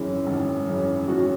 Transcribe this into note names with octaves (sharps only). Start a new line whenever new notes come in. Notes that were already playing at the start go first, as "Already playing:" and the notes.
Already playing: G#1 F#2 C#3 E3
G#1
F#2 C#3 E3
G#1 F#4